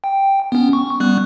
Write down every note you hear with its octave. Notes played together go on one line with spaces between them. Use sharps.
G5
B3 C#4
C#6
G3 B3 F#6